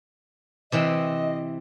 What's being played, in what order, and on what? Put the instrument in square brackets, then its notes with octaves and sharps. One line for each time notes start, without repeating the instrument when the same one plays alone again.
[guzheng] C3 E3 C4 [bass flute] D#5